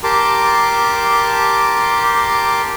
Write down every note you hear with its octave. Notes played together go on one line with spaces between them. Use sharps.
G4 A#4 A5 C6 D6